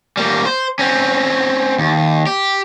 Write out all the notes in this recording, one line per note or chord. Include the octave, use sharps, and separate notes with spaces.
G3 A#3
C5
C4 C#4
D#2
G4